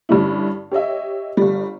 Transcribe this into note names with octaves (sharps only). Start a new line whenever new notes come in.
G2 D3 G3 C#4 E4
G4 C#5 D#5 E5
G1 G3